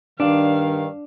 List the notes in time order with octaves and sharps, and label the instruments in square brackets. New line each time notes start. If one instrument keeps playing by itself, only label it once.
[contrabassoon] G2 [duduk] D#3 [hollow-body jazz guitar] D4 [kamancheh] F5